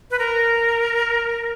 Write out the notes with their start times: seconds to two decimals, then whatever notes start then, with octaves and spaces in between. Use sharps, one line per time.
0.11 B4
0.19 A#4